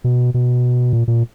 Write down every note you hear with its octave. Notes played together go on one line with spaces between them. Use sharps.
B2
B2
A#2
A#2